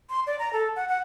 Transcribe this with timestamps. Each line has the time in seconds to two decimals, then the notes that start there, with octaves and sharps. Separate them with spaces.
0.10 C6
0.27 D5
0.39 A#5
0.53 A4
0.76 F#5
0.89 F#5